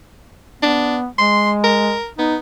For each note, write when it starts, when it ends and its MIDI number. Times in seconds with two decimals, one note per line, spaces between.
0.63 1.07 59
0.63 0.98 62
1.18 1.96 56
1.18 1.51 84
1.64 2.08 70
2.19 2.38 59
2.19 2.36 63